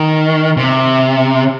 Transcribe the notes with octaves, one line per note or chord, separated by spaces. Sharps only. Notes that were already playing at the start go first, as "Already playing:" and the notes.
Already playing: D#3
C3